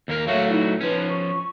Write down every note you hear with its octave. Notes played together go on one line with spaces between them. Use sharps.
D#2 A#3 A#4
F#3 A3 F#4 C#5 E5 F5
D#4 E4
F3 C#4 D#4 B4
C#6